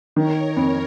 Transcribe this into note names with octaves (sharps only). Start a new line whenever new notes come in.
D#3 A#4 C#5
F2